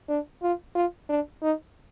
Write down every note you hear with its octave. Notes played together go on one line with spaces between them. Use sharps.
D4
F4
F4
D4
D#4